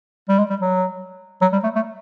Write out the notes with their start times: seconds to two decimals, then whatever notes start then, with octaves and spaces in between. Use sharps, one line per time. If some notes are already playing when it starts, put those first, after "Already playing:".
0.29 G3
0.38 G#3
0.50 G3
0.61 F#3
1.41 F#3
1.53 G3
1.64 A3
1.75 A3